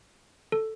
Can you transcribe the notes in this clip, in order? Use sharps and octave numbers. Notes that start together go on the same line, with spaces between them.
A4